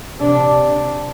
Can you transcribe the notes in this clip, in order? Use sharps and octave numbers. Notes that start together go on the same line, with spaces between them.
C3 D4